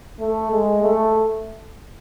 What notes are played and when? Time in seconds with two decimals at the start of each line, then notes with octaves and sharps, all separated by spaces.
0.20 A3
0.52 G#3
0.82 A3